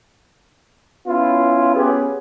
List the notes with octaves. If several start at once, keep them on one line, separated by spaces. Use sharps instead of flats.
B3 C#4 E4 F4
B3 C#4 G4 G#4 B4